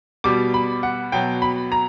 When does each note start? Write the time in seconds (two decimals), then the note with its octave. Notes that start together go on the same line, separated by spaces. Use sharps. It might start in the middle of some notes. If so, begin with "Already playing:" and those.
0.24 B2 G3 D6
0.54 B5
0.83 F#5
1.12 B2 F#3 G5
1.42 B5
1.72 A#5